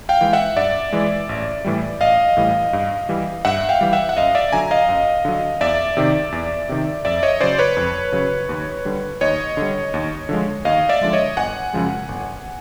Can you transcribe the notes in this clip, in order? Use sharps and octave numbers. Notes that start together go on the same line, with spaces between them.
F5 G5
E3 G#3
E5 F#5
G2 D5 E5
E3 G#3
A1
A2 E3 G3
A1 D#5 F5
A2 E3 G3
G2
E3 G3
G2 E5 F#5
F5 G5
E3 G3
E5 F#5
F#5
F#2 D#5 F5
D5 E5
D3 F#3 G#5 A#5
D#5 F5
F#2
D3 F#3
E2 D5 E5
C3 D#3
E2
C3 D#3
F2 D5 E5
C#5 D#5
C#3 F#3 C5 D5
B4 C#5
F2
C#3 F#3
D#2
D3 G3
D#2 C#5 D#5
D3 G3
D#2
D3 F3 G#3
D#2 D#5 F5
D5 E5
D3 F3 G#3
C#5 D#5
G1 F#5 G#5
F#2 C#3 F3 G#3
G1